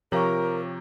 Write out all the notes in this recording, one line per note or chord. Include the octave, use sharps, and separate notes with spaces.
C3 F3 G4 A#4 C#5 F5 A#5 C#6